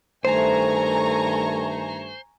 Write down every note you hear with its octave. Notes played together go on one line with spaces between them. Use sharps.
G2 D#3 A3 C5 G#5 A#5 C#6